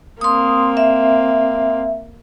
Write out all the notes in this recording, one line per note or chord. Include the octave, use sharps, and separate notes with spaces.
A#3 C4 C6 D#6
E5